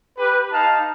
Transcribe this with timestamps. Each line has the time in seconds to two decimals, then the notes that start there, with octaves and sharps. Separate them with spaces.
0.18 G4 B4
0.53 D#4 F5 A5